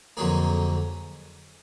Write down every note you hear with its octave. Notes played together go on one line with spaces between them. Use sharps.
F2 D3 F#3 A#3 G#4